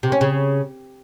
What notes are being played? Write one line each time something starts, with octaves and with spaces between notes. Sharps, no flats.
C3
C#4
C#3